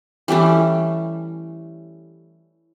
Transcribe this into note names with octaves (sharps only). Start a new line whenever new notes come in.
E3 G3 A3 C#4